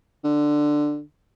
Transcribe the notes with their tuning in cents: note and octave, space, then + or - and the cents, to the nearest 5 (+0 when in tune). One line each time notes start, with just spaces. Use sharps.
D3 +10